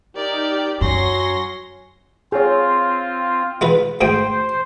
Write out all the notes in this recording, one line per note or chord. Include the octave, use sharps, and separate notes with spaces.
D#4 G4 A#4 D5
F#2 F#3 C#4 C6 A#6
C4 F4 G#4 C#5
G#3 F4 B4
D2 G#2 C5 G5